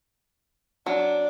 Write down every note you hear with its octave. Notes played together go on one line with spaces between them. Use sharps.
F#3 D4